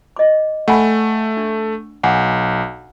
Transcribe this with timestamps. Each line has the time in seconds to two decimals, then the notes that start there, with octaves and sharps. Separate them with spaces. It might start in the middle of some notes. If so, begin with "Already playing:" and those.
0.16 D#5 D6
0.68 A3 F#5 G#5 B5
1.37 D4
2.03 B1 F#5 G#5 D6